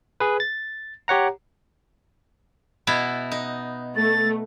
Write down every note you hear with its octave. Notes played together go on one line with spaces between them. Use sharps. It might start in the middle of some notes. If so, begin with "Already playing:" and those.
G#4 B4
A6
G4 C#5 F#5 A#5
B2 B3 E4
D#4
A3 A6